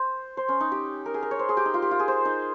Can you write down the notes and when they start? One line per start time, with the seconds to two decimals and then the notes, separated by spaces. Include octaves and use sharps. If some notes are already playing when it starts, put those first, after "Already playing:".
Already playing: C5
0.37 C5
0.48 C#4
0.60 D#4
0.72 G4
1.06 A#4
1.14 G#4
1.22 A#4
1.31 C#5
1.39 C5
1.49 G#4
1.57 G4
1.65 D#4
1.74 F4
1.82 G4
1.91 F4
1.99 G#4
2.08 C5
2.25 D#4